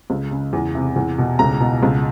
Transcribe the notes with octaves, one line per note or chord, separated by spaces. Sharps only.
C#2
C#3
E2
C3
E2
B2
C#2 A#5
B2
C#2